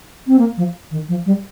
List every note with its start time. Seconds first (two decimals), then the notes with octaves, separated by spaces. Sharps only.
0.27 C4
0.39 A#3
0.57 F3
0.91 D#3
1.08 F3
1.26 G3